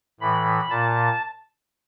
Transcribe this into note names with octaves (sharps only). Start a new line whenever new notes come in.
A2 E3 B5
A#2 A5